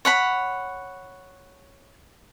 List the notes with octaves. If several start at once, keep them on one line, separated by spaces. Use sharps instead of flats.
C#5 F#5 B5